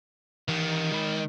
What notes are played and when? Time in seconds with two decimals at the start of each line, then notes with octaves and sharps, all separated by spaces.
0.48 D#3 E3 G4
0.92 G#3 B5